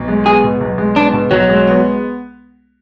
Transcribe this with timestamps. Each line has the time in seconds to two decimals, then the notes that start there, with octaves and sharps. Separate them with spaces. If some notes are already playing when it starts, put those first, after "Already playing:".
Already playing: B1
0.08 G#3
0.26 B3 G#4
0.44 B2
0.60 B1
0.78 G#3
0.96 B3 D4
1.13 B2
1.31 B1 F#3
1.49 G#3
1.67 B3